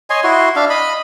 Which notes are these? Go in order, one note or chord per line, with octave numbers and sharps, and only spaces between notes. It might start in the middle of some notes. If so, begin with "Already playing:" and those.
C#5 D#5 G#5 C6
E4 F#4 C6
D4 E5 F5
D#5 B5